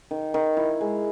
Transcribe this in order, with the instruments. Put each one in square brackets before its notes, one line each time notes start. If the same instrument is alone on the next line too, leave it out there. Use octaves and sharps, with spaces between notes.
[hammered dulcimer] D#3
D#3
E4
G#3